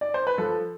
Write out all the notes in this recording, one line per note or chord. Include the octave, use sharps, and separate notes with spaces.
D5
C5
B4
F3 A4